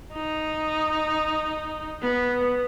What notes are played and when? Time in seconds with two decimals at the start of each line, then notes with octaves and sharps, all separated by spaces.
0.14 D#4
2.02 B3